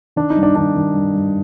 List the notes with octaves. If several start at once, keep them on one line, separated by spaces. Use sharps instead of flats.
D#3 D4
D#4
G2
D4
D#3 D4
D#3
G2
G2